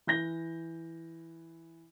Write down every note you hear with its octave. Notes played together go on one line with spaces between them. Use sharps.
E3 G6 A#6 G7